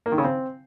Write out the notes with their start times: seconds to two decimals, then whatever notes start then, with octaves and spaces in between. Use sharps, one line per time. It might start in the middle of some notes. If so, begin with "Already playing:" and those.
0.06 A#3
0.12 D#3
0.18 C#3
0.24 C4